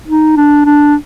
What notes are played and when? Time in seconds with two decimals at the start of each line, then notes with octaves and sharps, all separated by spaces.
0.08 D#4
0.37 D4
0.65 D4